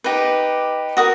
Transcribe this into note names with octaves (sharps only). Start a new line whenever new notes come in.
D#4 G4 B4
F#4 A#4 D#6